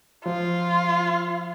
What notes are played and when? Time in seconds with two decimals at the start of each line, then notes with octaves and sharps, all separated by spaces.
0.25 F3 F4